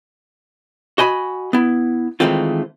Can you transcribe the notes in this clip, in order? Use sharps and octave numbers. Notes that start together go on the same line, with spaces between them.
F#4 D#5 G#5 B5
B3 E4
D#3 E3 G#3 A3 C4 F4